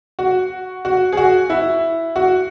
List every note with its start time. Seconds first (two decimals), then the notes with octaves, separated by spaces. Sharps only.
0.19 F#4
0.85 F#4
1.12 G#4
1.17 F#4
1.50 E4
2.16 F#4